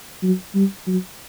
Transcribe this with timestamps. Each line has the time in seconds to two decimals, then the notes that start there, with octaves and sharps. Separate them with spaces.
0.23 F#3
0.55 G3
0.87 F#3